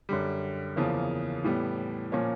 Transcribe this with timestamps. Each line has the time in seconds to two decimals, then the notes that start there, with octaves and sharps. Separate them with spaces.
0.09 F#2 D3 G3
0.76 E2 C#3 F3 A#3
1.44 A2 E3 G3 B3
2.12 A#2 F3 A#3 C#4